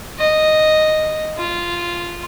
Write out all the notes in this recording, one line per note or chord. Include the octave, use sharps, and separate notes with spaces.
D#5
F4